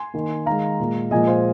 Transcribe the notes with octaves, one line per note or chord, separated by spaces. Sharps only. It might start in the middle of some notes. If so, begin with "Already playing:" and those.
Already playing: G#5 C6
D#3 A#3
D#3 G#3 F5 A#5
A#2 G#3
A#2 F3 G#3 D#5 G#5
C5 F5